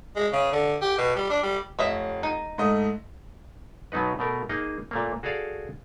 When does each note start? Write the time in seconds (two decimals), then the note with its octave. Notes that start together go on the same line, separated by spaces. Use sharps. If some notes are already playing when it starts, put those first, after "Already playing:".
0.16 G#3
0.32 C#3
0.52 D3
0.82 G4
0.98 B2
1.16 G3
1.30 D4
1.43 G3
1.79 F1 C#5 D#5 E5
2.23 D#4
2.58 G#2 A3 D#5
3.92 B2 F#3 B3 D#4 B4
4.19 B2 A3 A#4
4.49 A#3 D#4 G#4 D#5
4.91 A#2 A3 A#3
5.23 F#4 G#4 A4 D5 F5